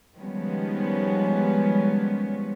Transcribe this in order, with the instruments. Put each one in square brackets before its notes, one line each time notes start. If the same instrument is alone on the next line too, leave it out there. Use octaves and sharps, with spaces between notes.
[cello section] D#3 F3 G3 G#3 B3 C#4